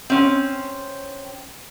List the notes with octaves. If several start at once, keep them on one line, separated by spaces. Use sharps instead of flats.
C4 C#4